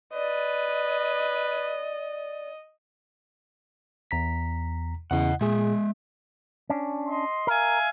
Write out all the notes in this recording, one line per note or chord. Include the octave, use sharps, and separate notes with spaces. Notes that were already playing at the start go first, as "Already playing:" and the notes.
B4 D5 D#5
E2 A#5 B6
E2 C#3 E4 D#5 F#5
A#2 G#3 G#4 E5
C#4 D4
D#5 C6
A#4 E5 F5 G#5